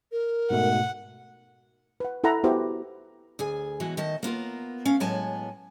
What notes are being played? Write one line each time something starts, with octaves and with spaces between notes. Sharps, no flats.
A#4
G#2 B2 A3 F#5
B4 F#5
E4 A4 F#5 A#5 B5
B3 E4 F#4 G4 B4 C5
D2 G#4 G#5
B2 E3 G#3 F#4
D#3 A3 D#5 A5
A#3 B3 F4 A#4
A3 C#4 F5
A2 F#3 G#3 B3 G#5 A5